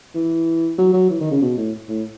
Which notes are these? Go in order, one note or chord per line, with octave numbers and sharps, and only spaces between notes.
E3
F#3
F#3
E3
D#3
C#3
B2
A2
A2